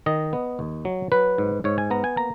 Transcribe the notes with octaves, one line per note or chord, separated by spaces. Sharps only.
D#3 D#5
B3
D#2
F#3
F#3 B4
G#2
G#2 C#5
G#5
B3 A#5
G#5
A#3 A#5